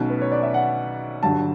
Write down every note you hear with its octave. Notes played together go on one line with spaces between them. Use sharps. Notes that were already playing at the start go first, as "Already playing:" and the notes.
Already playing: B1 B2 A3 C#4
B4
C#5
D5
E5
F#5
G1 G2 F#3 A5